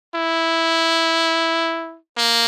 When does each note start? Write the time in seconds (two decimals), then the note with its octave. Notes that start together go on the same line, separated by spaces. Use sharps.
0.14 E4
2.17 A#3